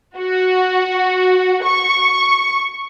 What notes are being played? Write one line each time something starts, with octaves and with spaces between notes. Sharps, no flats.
F#4
C#6